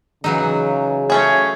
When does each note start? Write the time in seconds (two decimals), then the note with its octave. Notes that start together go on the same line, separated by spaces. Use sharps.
0.24 C#3 E3 F#3 D#4
1.10 A3 C#4 G#4 C#5